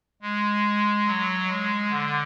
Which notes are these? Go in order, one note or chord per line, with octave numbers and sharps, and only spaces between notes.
G#3
F#3
G#3
D3